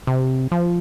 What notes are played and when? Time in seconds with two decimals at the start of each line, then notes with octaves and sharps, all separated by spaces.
0.07 C3
0.52 F3